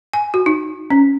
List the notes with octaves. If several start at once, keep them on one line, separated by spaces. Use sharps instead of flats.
G#5
F#4
D#4
C#4